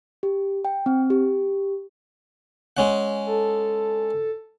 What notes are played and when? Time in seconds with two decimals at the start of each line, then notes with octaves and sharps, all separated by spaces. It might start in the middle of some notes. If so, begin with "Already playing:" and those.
0.23 G4
0.65 G5
0.86 C4
1.10 G4
2.77 G#3 C#4 F#5
3.26 A4